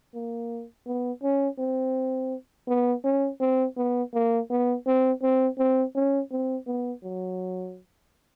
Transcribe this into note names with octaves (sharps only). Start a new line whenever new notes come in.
A#3
B3
C#4
C4
B3
C#4
C4
B3
A#3
B3
C4
C4
C4
C#4
C4
B3
F#3